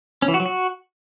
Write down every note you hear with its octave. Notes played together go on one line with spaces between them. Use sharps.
C#4
E3
F#4
F#3
F#4